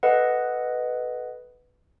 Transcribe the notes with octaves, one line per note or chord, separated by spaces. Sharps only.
A4 B4 D#5 F#5